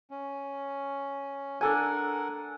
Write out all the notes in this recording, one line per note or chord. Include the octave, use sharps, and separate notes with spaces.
C#4
D4 A4 A#4 F#5 G#5